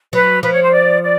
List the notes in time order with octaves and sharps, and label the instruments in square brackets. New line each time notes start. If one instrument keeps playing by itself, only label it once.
[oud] F#3 [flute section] B4
[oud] F3 [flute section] B4
[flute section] C#5
C5
D5
D5